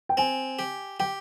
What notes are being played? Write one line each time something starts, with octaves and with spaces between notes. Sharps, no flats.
G5
C4 G#5
G4
G4 G5